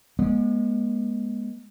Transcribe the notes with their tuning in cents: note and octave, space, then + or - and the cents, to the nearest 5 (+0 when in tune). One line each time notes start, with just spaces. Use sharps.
G#3 +0 B3 -45